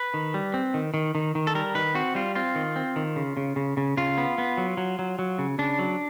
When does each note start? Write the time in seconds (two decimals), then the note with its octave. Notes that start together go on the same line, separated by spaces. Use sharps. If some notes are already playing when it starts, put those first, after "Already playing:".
Already playing: B4
0.14 D#3
0.34 G3
0.54 C4
0.74 D#3
0.94 D#3
1.15 D#3
1.35 D#3
1.47 A4
1.55 G3 A#4
1.75 D#3 B4
1.95 C4 F#4
2.15 G3 F4
2.35 C4 F4
2.55 D#3
2.76 C4
2.96 D#3
3.16 C#3
3.37 C#3
3.56 C#3
3.77 C#3
3.97 C#3 F4
4.18 B3
4.38 B3
4.57 F#3
4.77 F#3
4.99 F#3
5.19 F#3
5.39 C#3
5.59 C#3 D4
5.79 F#3